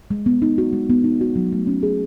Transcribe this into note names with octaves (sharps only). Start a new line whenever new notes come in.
G#3
B3
D#4
F#4
G#3
B3
D#4
F#4
F#3
A3
C#4
G#4